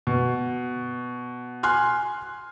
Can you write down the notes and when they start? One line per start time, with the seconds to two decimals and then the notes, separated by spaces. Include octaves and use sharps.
0.07 B2
1.63 G#5 C6 F6 F#6